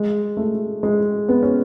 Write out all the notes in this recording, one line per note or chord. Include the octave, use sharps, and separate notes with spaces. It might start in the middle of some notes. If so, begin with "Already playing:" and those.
Already playing: G#3
A3
G#3
B3
C#4